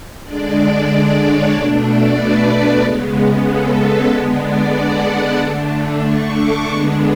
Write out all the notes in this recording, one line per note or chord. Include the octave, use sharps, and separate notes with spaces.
D3 G#3 D4 D5
D5
C#5
B2 A3 D4 D5
D5
B4
C#3 G#3 B3
A4
B4
D3 G#3 B3 D4 D5
D5
F#5
D3 A3 D4
C#6
D6
D3 G#3 B3 D4 C#6